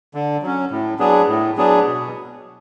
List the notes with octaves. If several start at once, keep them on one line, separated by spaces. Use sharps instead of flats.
D3
F#3 C#4
A2
F#3 B3 D4 G#4
A2
F#3 B3 D4 G#4
B2